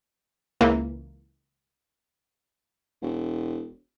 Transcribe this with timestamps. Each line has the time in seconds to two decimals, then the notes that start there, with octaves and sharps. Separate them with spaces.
0.61 C#2 E3 A#3
3.02 E1